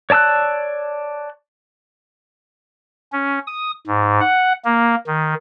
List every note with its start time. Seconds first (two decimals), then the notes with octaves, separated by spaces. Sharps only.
0.10 C#5 D5 A5 E6 F#6
3.12 C#4
3.47 D#6
3.87 G#2
4.20 F#5
4.65 A#3
5.07 D#3